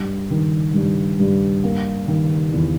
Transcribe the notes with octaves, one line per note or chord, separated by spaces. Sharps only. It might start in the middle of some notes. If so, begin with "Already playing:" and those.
Already playing: G2
D#3
G2
G2
A#3
D#3
E2